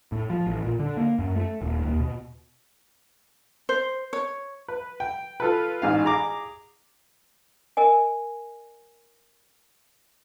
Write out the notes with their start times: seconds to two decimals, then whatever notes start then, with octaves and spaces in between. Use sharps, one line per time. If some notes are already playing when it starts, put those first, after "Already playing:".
0.12 A2
0.30 F3
0.47 A1
0.64 A#2
0.79 D3
0.97 A#3
1.19 F#2
1.36 A3
1.62 D#1
1.85 D#2
2.00 B2
3.69 C5
4.13 C#5
4.68 B4
5.00 G5
5.40 F4 A4 B4
5.82 A1 G#2 F5
6.04 G#4 A#5 D6
7.77 A#4 D#5 G#5